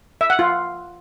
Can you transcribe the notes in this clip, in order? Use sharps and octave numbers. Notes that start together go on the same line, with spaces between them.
E5
F#5
F4